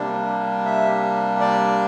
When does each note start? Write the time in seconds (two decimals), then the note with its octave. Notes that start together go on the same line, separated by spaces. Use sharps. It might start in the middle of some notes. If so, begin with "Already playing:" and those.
Already playing: C3 G3 A#3 D4
0.65 E5
1.41 D5